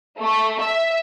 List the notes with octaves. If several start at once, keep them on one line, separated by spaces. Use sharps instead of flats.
A3
E5